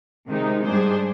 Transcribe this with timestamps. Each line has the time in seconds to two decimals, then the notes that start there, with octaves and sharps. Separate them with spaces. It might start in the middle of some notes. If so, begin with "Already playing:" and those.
0.28 C3 D#3 G#3 D#4
0.64 G#2 G3 D4 G#4 C5